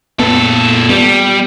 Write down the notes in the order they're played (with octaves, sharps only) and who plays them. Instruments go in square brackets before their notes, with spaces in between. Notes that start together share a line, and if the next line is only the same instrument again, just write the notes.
[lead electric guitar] A#2 A4 [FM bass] B3
[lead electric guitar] G3 [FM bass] B3